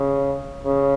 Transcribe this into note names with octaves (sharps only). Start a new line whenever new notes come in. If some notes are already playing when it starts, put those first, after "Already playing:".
Already playing: C#3
C#3